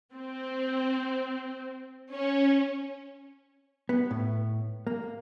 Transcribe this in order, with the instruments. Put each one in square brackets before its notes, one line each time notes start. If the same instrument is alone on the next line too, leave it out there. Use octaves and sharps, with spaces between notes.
[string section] C4
C#4
[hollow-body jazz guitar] B3
A2
A#3